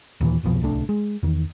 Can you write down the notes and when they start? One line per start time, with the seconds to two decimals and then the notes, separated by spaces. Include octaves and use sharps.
0.21 D#2 A#2 E3
0.43 F1 C2 B2 F3
0.61 D1 C2 A3 D4
0.89 G#3
1.23 E2 D#3